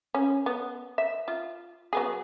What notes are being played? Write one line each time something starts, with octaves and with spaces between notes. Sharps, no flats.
C#4
B3
E5
F4
F#3 B3 G#4